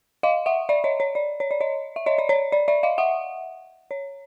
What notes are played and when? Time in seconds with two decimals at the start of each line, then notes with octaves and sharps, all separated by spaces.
0.23 D#5 F5
0.46 E5 F#5
0.69 D5 E5
0.84 C#5 D#5
1.00 C#5
1.15 D5
1.40 C#5
1.51 D5
1.61 C#5 D#5
1.96 E5
2.06 C#5 D#5
2.18 D5
2.29 C#5
2.52 D5
2.68 D5 E5
2.83 D#5 F5
2.98 E5 F#5
3.91 C#5